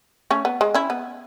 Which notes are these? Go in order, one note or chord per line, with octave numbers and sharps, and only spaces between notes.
A3 C#4
B3
G#3
C#4 E4
B3